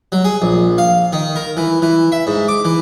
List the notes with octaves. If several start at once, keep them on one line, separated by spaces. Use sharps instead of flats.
F#3
G#4
A#1
F5
D#3
A#4
E3
E3
E5
G#2
D6
E3